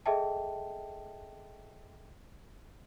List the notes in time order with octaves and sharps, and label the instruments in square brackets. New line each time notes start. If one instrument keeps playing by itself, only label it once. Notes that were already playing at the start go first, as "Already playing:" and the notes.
[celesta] G#4 A4 D#5 E5 G5 A5